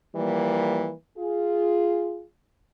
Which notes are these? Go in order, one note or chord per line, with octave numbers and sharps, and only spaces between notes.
E3 F3 G3 A#3
F4 G#4